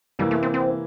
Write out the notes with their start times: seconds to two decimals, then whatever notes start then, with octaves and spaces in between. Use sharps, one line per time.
0.19 C3 E3 G3 A#3 E4
0.31 A3
0.43 C4
0.54 C4